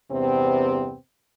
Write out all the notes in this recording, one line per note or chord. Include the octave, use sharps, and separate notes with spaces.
E2 G2 C3 B3 C4